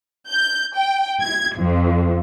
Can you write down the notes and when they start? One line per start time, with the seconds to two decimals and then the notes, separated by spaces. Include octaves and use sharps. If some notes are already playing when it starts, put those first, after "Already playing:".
0.28 G6
0.75 G5
1.22 G#6
1.57 F2